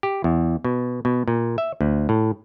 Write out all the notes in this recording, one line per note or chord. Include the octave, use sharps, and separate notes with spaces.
G4
E2
B2
B2
A#2
E5
D2
A2